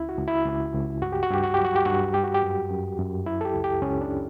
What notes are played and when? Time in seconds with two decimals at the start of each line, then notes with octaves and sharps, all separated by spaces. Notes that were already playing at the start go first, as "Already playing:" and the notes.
Already playing: C#2 C#3 E4
0.09 F#4
0.18 C#2
0.28 E4
0.46 C#2
0.74 C#2
1.02 G2 F#4
1.12 G4
1.23 F#4
1.31 G2 G4
1.44 F#4
1.54 F#3 G4
1.65 F#4
1.75 G4
1.85 G2 F#4
2.14 G3 G4
2.24 F#4
2.34 G4
2.42 F#2
2.70 F#2
2.98 F#2
3.26 F#3 E4
3.41 A4
3.45 G4
3.54 C#2
3.64 G4
3.82 C#2 C#4
4.01 D4